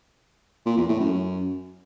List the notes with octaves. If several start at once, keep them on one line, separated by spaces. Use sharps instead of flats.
A#2
E2
A2
F#2